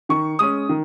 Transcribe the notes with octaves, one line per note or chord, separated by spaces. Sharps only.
D#3 C#6
G#3 C#4 D#6
D#3